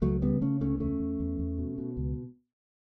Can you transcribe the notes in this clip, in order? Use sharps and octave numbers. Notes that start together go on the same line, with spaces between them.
C#2 F#3 A3
C#3 G3 B3
C#3 A3 C#4
C#2 A3 C#4
E2 A3 C#4
E2
E2
E2
B2
B2
C#2